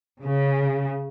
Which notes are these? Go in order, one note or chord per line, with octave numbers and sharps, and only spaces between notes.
C#3